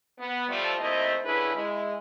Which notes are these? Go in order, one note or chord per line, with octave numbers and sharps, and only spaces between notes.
B3
F3 G3 A3
D#2 C3 A3 E4 C5 D#5
D3 C#4 E4 G#4 B4
G#3 E4